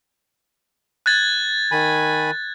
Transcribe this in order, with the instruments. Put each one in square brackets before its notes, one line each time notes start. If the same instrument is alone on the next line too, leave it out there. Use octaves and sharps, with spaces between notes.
[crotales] F#6 G#6 A6
[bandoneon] D#3 G#5 B5